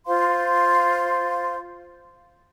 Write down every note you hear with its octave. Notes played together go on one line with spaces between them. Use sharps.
F4 C5 F5 C6